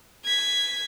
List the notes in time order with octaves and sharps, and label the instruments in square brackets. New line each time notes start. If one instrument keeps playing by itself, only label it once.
[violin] G#6 B6